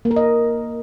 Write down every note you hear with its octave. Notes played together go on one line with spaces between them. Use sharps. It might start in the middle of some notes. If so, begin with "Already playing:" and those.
A#3
A#4
D#5